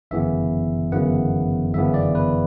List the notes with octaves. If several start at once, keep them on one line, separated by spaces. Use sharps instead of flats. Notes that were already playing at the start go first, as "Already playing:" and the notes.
G1 F#2 C#3 E3 B3 E5
G1 F#2 C#3 E3 B3 F#5
G1 F#2 C#3 E3 B3 E5
D5
B4